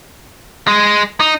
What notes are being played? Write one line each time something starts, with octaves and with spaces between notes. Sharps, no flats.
G#3
D#4